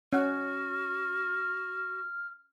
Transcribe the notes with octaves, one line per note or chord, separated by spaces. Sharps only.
C#4 F#4 F#5 F6